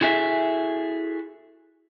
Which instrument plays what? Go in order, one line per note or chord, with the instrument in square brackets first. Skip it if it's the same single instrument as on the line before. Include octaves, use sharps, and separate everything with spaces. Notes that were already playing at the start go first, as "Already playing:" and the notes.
[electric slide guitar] E4 F#4 G#4 A4 E5